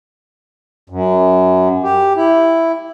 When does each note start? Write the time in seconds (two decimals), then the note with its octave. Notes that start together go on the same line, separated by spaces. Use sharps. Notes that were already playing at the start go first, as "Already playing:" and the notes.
0.90 F#2
1.83 G4
2.16 E4